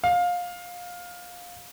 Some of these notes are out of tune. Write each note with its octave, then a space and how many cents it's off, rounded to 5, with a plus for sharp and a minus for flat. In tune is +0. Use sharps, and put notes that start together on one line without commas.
F5 +20